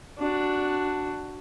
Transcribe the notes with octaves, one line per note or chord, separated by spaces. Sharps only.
D4 F#4